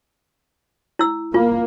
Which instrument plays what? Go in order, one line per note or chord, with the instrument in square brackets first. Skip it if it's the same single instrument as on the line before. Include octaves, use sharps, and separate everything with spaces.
[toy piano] E4 E6
[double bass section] A#3 [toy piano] F4